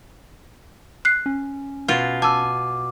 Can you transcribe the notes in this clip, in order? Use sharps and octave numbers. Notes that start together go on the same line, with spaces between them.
F#6 C7
C#4
B2 F4
G#5 A5 D6 E6